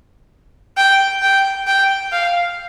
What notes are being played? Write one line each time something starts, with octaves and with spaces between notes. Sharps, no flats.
G5
G5
G5
F5